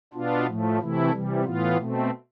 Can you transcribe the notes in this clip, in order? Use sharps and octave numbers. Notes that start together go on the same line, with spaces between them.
B2 B3 D4 F4
A2 F3 A3
C3 E3 A3 E4
C3 E3 G3
A2 E3 B3 F4
B2 A3 C4